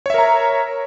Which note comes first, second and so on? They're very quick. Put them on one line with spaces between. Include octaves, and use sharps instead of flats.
C#5 E5 A#4 A#5